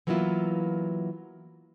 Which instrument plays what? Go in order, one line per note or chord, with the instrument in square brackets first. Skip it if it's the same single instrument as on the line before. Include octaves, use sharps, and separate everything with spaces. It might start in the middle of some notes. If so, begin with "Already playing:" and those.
[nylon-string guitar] E3 F#3 A#3 B3 E4 F4